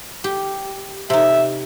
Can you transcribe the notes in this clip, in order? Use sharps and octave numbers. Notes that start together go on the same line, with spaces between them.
G4
C3 D#4 E5